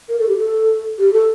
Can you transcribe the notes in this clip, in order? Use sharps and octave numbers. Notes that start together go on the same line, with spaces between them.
A#4
A4
G4
A4
G4
A4